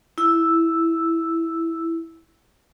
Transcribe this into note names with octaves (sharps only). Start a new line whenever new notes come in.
E4 E6